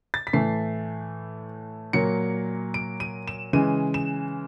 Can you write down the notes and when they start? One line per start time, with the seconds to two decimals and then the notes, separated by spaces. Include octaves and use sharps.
0.14 A6
0.27 B6
0.33 A2 E3 A3 C7
1.93 A#2 F#3 A#3 C#7
2.74 D7
3.00 D#7
3.28 E7
3.53 C#3 E3 G#3 D#7
3.94 E7